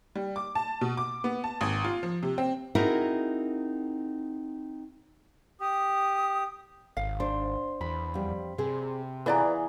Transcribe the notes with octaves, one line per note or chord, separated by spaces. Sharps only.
G3
D6
A5
B2
D6
B3
A5
G#1
F4
F3
C3
C4
C4 D#4 E4 F#4 G#4 A#4
G4 D#6
G#1 F5
D4 C5
E2 B5
F2 G3
C3 C4 G#4 C5
E3 B3 F4 G#4 B4 D5 A#5